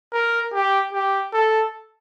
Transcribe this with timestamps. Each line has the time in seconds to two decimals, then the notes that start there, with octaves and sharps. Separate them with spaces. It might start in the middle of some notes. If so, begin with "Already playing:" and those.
0.13 A#4
0.53 G4
0.94 G4
1.33 A4